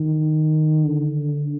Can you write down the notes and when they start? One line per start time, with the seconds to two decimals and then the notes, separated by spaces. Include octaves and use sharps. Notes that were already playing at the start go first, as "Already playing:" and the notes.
Already playing: D#3
0.85 D3